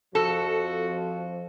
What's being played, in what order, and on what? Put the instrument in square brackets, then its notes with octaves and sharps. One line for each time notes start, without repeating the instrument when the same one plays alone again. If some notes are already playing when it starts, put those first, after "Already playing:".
[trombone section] F2 F3 [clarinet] F#4 [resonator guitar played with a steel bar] A4